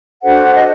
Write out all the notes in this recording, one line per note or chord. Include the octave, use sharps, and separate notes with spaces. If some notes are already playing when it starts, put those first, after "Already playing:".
D4 F#4 A4 C5 F#5
D#5